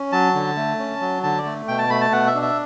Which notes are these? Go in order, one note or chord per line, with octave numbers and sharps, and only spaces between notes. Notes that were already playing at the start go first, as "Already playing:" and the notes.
Already playing: C#4
F#3 A5
D3
A3
C#4
F#3
D3 A5
D5
A3
B2 G5
A5
A3 B5
A5
B2 F#5
E5
D4
E5